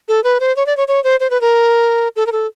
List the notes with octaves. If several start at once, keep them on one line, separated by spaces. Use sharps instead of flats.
A4
B4
C5
C#5
D5
C#5
C#5
C5
C5
B4
A#4
A4
A#4
A4